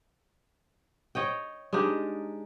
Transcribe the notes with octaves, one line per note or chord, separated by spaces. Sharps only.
C#5 D#5 G5
G#3 D4 D#4 G4